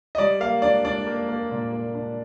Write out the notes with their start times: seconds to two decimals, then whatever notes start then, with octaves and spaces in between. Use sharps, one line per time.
0.15 D#5
0.18 G3 D5
0.40 A#3 F5
0.62 D4 D5
0.85 D4 D5
1.07 A#3
1.29 A#3
1.51 A#2
1.73 A#3
1.95 D4